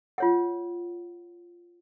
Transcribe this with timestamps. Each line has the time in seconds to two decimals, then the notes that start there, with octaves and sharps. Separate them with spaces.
0.18 F4 C#5 F#5